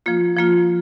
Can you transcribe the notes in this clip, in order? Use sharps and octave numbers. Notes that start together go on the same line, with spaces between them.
F3 A#3 F4
F3 A#3 F4